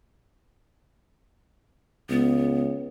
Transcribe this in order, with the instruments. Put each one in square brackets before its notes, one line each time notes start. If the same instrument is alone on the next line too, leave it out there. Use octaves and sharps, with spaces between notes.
[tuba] C#2 [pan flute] B3